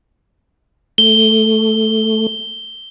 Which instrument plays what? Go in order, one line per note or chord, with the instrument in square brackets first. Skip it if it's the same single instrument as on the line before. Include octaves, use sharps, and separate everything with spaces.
[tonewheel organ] A3 [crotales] G7